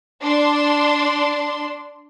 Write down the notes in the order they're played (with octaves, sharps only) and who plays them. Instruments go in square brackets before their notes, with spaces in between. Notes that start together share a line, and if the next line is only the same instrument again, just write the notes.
[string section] D4 C6